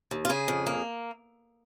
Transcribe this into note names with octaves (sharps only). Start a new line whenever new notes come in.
D#2
F4
C#3 G#4
F2
A#3